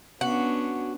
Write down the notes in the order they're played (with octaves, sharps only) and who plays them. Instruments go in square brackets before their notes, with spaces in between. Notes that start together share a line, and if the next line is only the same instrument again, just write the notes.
[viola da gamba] B3 C#4 D4 [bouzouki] F#4